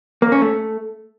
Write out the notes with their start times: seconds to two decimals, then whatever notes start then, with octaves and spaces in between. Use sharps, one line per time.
0.22 A#3
0.32 C#4
0.42 A3